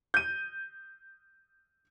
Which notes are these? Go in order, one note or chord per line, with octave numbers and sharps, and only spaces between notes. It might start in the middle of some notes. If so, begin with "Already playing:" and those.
G6 D#7